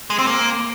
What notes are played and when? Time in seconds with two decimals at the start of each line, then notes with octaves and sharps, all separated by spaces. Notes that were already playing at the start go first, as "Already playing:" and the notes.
0.10 G#3
0.19 C4
0.27 A#3